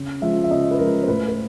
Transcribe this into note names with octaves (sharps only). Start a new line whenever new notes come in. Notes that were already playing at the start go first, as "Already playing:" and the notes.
Already playing: C#3
F3 G#3 E5
E5
C#3 D#5
B4
F3 G#3 A#4
C5
A2 B4
B4